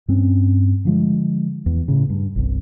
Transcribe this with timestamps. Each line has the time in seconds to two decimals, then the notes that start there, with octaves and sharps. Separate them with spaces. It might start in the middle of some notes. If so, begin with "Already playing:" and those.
0.08 G2 C4 C#4
0.85 D3 F3 G#3
1.66 E2
1.88 A2 C#3
2.10 G2
2.36 G1 C2